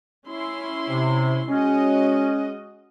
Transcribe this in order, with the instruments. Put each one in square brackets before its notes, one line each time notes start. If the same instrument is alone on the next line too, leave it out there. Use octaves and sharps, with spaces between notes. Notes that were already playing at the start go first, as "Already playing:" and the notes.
[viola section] C#4 E4 C6
[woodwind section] C3
[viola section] G#3 F#4 D#5 [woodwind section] C#4